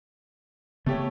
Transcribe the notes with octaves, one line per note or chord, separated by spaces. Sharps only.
C#3 A3 B3 G4 C#5